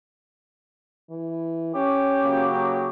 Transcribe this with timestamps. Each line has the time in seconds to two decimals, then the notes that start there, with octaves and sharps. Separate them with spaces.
1.10 E3
1.75 C#4 G4
2.22 C#3 F#3 A#3